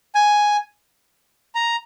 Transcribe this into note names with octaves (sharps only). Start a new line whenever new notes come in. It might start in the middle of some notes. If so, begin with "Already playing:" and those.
G#5
A#5